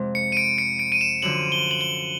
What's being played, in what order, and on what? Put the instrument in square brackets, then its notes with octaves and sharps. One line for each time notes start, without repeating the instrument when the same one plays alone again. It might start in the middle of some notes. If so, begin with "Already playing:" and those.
Already playing: [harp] F2 C3 F3 G#3
[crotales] C#7
D#7
D7
C#7
D7
D#7
E7
[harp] F#2 D3 F3 [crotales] F#7
[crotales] G7
F#7
G7